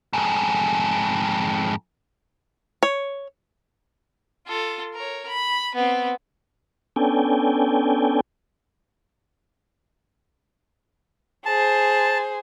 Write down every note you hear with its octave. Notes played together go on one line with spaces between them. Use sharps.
F2 G#2
C#5
F4 A4
A#4 C#5
B5
B3 C4
B3 C#4 D4 A4 G5 G#5
G#4 C5 A5